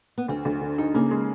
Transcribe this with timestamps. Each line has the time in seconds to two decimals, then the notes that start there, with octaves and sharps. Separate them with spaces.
0.18 B3
0.28 D2 C4
0.45 D2
0.61 D3
0.78 D#4
0.94 C#3 A#3
1.11 G#3